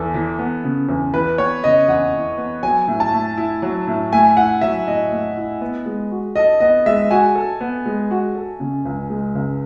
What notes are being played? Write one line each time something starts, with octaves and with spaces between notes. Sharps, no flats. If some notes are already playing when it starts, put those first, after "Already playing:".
Already playing: E2 A4
E3
B3
C#3
E2
E3 B4
B3 C#5
C#3 D#5
E2 F#5
E3
B3
F#3 G#5
A2
A5
A3
E4
F#3
A2
A3 G#5
E4 F#5
F#3 E5
A2 D#5
A3
E4
B3
G#3
F#4
A4 D#5
B3 D#5
G#3 E5
F#4 G#5
A4
B3
G#3
F#4
A4
C#3
C#2
G#3
C#2